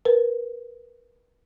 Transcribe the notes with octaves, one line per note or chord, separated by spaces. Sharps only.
A#4 B4